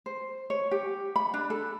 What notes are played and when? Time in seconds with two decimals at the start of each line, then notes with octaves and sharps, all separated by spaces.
0.06 C5
0.50 C#5
0.71 G4
1.16 B5
1.34 D4
1.50 A4